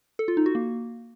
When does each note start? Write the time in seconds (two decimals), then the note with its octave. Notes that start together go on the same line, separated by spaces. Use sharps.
0.19 A4
0.28 F4
0.37 D#4
0.46 F#4
0.55 A#3